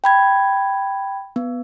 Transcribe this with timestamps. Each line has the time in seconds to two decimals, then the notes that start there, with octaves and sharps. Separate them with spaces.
0.04 G5 B5 G#6
1.36 B3